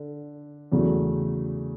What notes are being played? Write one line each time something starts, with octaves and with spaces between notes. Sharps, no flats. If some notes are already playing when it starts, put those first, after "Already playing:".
Already playing: D3
E2 C#3 F#3 A3